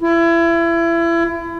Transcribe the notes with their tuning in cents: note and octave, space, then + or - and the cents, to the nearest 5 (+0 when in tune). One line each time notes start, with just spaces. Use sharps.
E4 +30